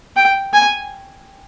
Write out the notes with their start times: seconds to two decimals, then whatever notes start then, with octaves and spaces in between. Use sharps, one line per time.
0.16 G5
0.53 G#5